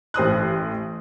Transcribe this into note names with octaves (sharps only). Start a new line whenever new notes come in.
A1 C5 D#6 F#6